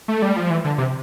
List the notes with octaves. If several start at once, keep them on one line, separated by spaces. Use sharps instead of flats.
A3
G3
F3
E3
D3
C3